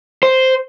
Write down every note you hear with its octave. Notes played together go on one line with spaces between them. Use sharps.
C5